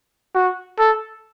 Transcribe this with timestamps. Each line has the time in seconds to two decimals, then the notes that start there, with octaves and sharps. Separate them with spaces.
0.35 F#4
0.79 A4